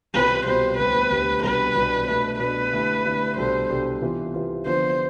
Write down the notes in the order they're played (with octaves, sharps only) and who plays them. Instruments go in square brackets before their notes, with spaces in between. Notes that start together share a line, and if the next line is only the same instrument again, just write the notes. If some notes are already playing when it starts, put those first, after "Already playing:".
[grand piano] C2 B2 G3 C4 F4 [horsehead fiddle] B4
[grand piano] C2 B2 G3 C4 F4 [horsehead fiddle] C5
[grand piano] D2 C3 G3 B3 [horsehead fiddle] B4
[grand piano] D2 C3 G3 B3
[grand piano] C2 B2 G3 D4 [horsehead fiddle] B4
[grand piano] C2 B2 G3 D4
[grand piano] B2 A3 D4 [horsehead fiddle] B4
[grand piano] B2 A3 D4 [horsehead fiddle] B4
[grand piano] D3 A3 E4 G4
D3 A3 E4 G4
[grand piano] C2 B2 G3 D4 A4 [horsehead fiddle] C5
[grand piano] C2 B2 G3 D4 A4
C3 E3 B3 F4
C3 E3 B3 F4
[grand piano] D3 F3 B3 F4 [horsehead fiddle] C5